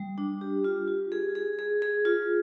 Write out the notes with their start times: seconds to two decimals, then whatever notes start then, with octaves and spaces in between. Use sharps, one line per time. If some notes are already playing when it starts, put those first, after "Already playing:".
Already playing: G3
0.18 D4
0.41 G4
0.64 F4
0.88 F4
1.12 G#4
1.35 G#4
1.59 G#4
1.82 G#4
2.05 F4